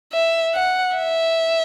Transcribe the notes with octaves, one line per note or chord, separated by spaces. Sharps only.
E5
F#5
E5